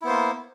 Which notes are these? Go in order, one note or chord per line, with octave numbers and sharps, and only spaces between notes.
A#3 B3 E4 C5